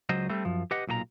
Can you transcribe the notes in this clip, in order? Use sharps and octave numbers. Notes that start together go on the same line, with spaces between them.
C#2 F#3 C5 D#5
G3 A3 C4
F#2 F3
G4 B4 D#5 F#5
B1 A#2 F#4 A#5